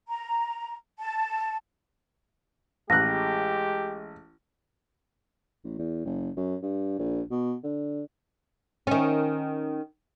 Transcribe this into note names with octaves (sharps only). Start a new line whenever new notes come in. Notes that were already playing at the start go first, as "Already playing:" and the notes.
A#5
A5
A1 G#3 G4 F#6 A#6
A1
E2
F#1
F#2
G2
A#1
B2
D3
D#3 C#4